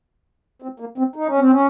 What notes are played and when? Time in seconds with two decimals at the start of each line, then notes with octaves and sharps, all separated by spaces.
0.62 C4
0.80 A#3
0.98 C4
1.16 D#4
1.28 C#4
1.39 C4
1.51 C#4